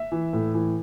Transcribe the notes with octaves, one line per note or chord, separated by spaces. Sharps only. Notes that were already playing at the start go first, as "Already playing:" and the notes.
Already playing: E5
E3
A2
E3